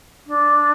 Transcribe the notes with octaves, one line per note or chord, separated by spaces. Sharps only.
D4